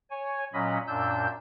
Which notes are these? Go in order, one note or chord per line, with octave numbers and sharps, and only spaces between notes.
C#5 G#5
A#2 F#3 C#4 D#5 B5
F#2 A#2 D4 E6 G6